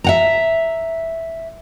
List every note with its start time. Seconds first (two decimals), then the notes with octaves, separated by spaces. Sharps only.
0.04 E5 F#5 A#5